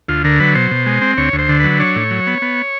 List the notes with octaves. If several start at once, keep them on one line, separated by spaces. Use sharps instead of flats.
D2 F4
D3 A#4
F#3 B4
B2 C5
B2
G#3
C4
D2 C#5
D2
C5
D3
F#3 B4
D4 C#5
A2
F#3
B3
B3